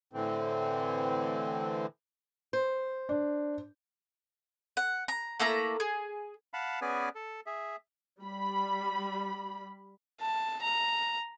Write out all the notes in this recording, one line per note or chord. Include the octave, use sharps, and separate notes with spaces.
A2 D3 E3 C4
C5
D4
F#5
A#5
A3 A#3 E4 A#5
G#4
F5 F#5 A5 B5
B3 C#4 G#4 B4 D5 G#5
A4
G#4 E5
G3 B5
A5
A#5